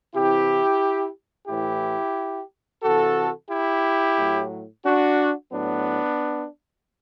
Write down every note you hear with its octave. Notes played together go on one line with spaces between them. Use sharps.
C3 E3 E4 G4
A2 E3 E4 G4
C3 E3 F#4 A4
E4 G4
A2 F#3
D4 F#4
A2 F#3 B3 D4